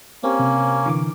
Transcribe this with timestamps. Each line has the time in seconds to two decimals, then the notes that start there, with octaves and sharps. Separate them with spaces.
0.23 A#3 C4 C#4 G4
0.39 C3
0.86 D3 E3 D6